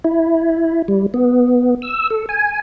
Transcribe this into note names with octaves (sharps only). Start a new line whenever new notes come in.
E4
G3
B3
E6
A4
G#5